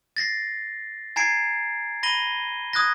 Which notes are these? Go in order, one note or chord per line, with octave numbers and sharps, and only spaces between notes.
A6 A#6 C7
G#5 A#5 G#6 A6 C7 D7
B5 A#6 D#7 G7
D#6 F#6 G#6 A#6